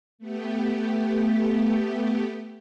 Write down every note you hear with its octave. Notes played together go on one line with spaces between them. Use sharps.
A3 B3 G4